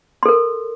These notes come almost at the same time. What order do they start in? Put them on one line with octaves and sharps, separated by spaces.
C6 A4 A#4